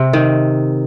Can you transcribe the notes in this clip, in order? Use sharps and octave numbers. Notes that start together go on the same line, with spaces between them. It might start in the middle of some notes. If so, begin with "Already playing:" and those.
Already playing: C3
D#3